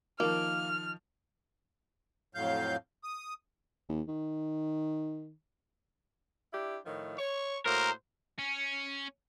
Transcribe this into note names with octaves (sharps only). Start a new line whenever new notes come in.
D#3 F3 A#3 F6
F2 A2 F#3 F5 G6
D#6
D#2
D#3
D4 E4 G4
A2 D#3 F3
C#5 C#6
A2 A#3 F#4 A#4 C5
C#4